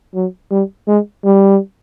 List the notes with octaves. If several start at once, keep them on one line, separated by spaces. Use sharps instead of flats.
F#3
G3
G#3
G3